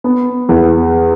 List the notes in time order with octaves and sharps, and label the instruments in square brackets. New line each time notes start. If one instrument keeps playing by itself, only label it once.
[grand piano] B3
E2